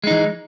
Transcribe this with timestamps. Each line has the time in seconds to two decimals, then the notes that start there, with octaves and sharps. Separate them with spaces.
0.04 G#3
0.07 D#4
0.11 E3